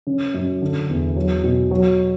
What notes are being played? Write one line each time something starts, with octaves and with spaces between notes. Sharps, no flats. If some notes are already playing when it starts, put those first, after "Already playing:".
C#3
F#2
D3
E2
F#3
B2
F#3